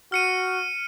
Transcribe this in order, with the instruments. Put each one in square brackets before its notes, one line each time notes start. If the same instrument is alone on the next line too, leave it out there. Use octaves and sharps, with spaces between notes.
[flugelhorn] F#4 [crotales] F6 C#7 D#7